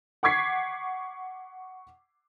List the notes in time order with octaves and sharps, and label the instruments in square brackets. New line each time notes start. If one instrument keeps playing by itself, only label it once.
[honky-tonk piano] F#5 C#6 D6 G#6 B6 C7